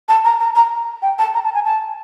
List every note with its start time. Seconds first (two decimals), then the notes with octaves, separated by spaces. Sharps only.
0.08 A5
0.24 A#5
0.40 A#5
0.55 A#5
1.02 G5
1.18 A5
1.34 A#5
1.44 A5
1.55 G#5
1.65 A5